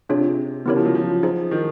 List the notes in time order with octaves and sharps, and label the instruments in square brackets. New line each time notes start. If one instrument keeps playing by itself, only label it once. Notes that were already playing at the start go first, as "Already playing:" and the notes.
[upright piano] C3 [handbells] D4 F4 G#4 C#5
[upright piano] C#3 [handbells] B3 E4 G4 A#4 C#5
[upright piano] F3
F#3
F3
[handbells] D#4 G#4 C5
[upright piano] D#3